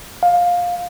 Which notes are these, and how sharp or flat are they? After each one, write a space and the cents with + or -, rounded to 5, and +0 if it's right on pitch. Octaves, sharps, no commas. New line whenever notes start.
F5 +15